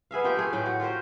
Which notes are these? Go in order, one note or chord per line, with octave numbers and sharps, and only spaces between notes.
B3 G#4 E5 F5
A#3 F4 G4 G5
A3 G#4
A2 G5
F#4
F4 G4 A#4 C5